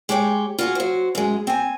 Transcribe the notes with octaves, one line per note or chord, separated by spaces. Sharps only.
G#3 G4 C#5 G5
F4 F#4 G#4
F#3 C5
F#2 G#3
C4 G#5